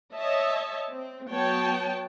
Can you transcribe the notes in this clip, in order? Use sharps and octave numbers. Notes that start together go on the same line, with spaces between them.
C#5 D#5 E5 A5
C4
F#3 B3 C#5 G5 A5